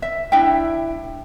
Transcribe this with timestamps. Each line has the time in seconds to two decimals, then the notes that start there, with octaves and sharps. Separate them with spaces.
0.02 E5
0.32 D4 E4 E5 G5